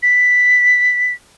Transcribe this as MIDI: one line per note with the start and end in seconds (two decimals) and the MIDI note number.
0.03 1.12 95